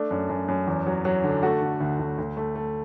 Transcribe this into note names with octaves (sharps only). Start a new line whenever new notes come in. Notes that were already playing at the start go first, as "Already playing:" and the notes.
Already playing: A3 D4
F#2
F#2
F#2
E2
F#3
F#3
D3
A3 F#4
D3
D2
D2
D2
A3
A3